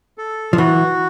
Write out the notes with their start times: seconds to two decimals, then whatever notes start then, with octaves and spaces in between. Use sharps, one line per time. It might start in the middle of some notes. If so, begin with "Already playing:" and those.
0.18 A4
0.53 F3
0.58 E3 F#4